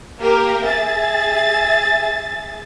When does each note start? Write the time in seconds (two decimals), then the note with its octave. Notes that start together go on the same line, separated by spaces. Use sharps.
0.19 A#3 G4 A#4
0.65 G#4 E5 A6